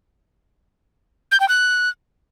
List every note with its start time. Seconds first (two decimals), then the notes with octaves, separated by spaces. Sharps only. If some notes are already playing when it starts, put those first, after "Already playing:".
1.32 G6
1.40 G5
1.48 F#6